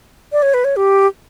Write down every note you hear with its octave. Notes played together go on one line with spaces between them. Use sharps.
D5
C#5
B4
C#5
G4